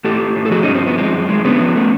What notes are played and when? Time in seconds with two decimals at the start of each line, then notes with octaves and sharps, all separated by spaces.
0.04 A2 G4 A4
0.21 A2
0.36 A2
0.46 A4
0.51 F3 F#4 G#4
0.63 G2 C#4 D#4
0.75 C4
0.83 F3 B3
0.98 G#3 C4
1.13 F#2
1.29 G#3
1.45 D3 B3 C#4
1.60 F3
1.76 A3